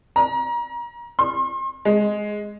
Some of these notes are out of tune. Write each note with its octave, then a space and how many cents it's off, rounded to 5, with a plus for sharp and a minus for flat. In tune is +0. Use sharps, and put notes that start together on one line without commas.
A#5 +30
C6 +40
G#3 +5